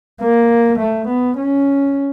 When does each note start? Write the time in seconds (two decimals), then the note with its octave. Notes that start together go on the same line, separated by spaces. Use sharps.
0.21 A#3
0.78 A3
1.07 B3
1.37 C#4